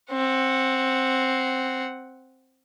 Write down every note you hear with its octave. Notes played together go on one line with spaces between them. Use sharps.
C4 F#5